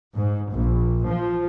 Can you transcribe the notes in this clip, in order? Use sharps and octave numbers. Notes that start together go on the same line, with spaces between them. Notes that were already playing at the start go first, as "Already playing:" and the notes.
G#2
A#1
F3